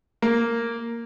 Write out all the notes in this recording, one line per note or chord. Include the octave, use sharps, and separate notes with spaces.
A#3